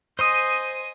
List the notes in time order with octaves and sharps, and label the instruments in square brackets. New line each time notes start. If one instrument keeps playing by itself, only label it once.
[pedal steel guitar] C5 C6 D#6 [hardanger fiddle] D#5 G#5